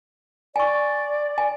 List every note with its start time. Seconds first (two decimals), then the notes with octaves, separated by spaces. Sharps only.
0.56 D5 G#5 C#6
1.38 G#5